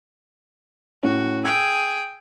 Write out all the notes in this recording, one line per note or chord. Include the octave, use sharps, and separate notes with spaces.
A2 C#4 F#4
G#4 G5 E6 G#6 D7